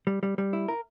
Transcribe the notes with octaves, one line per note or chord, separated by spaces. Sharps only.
G3
G3
G3
E4
A#4